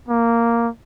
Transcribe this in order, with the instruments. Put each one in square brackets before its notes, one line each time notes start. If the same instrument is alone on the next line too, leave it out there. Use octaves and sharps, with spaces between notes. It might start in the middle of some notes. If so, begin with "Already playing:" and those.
[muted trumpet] A#3